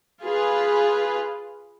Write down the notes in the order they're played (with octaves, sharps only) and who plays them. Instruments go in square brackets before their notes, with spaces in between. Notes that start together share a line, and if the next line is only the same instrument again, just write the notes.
[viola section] F4 G#4 B4